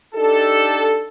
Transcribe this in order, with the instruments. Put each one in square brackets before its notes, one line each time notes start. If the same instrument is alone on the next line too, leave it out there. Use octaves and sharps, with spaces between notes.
[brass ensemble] D4 D#4 G4 A4